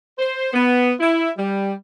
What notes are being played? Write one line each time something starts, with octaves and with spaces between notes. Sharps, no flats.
C5
B3
E4
G3